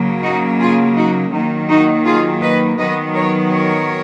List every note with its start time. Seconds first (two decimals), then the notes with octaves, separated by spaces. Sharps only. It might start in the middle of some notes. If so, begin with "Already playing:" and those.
Already playing: C#3 F#3 A#3
0.22 D#4 F#4
0.59 F4 G#4
0.95 D#4 F#4
1.32 D#3 F#3 A#3 D#4
1.68 D#4 F#4
2.05 F4 G#4
2.41 B4 D#5
2.77 D#3 F#3 B3 B4 D#5
3.14 A#4 C#5
3.51 A#4 C#5